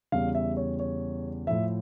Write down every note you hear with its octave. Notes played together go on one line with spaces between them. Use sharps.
E2 C#3 G3 F5
E5
C#5
C#5
A2 F3 E5